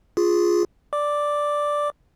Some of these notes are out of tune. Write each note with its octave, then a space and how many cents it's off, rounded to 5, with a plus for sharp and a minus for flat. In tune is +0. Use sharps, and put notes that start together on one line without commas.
F4 +0 G#4 -5
D5 +0 D6 +0